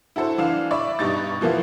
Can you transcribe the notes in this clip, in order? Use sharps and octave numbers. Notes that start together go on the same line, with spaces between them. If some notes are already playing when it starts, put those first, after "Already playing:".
E4 F#4 A4 C5
E3 D4 F5 E7
D5 E5 B5 C#6
G2 B2 D#4 G4 C#6 A6
E3 F3 A#3 B3 E4